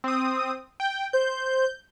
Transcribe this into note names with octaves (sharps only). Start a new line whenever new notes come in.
C4 D#6
G5
C5 G6